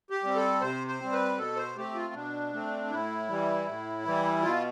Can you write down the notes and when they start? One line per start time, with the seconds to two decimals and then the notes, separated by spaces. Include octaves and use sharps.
0.10 G4
0.23 G3 C4
0.36 A4
0.61 C3 C5
0.87 C5
1.00 G3 C4
1.12 B4
1.38 B2 A4
1.57 C5
1.77 A3 C4 G4
1.95 F4
2.14 B2 D4
2.53 A3 C4
2.90 A2 E4
3.29 E3 G3
3.66 A2
4.06 E3 G3
4.43 B2 F4